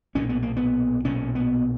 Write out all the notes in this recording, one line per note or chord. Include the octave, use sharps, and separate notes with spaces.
B1 A#2 C#4
B3
A#3
B3
B1 A#2 C#4
B3